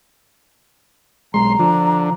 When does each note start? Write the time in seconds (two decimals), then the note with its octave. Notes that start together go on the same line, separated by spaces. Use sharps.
1.34 B1 G#3 A#5 C6
1.59 D3 F3